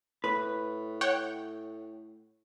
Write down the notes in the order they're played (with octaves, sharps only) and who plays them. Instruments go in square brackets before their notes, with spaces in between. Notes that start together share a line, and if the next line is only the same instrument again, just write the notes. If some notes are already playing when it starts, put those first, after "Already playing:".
[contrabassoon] A2 [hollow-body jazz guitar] B4
[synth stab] C#5 F#5 G5